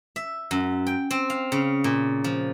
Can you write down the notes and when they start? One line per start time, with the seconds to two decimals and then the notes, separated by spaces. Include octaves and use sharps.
0.16 E5
0.51 F#2
0.87 G5
1.11 C4
1.30 F5
1.52 C#3
1.84 A#2
2.24 F3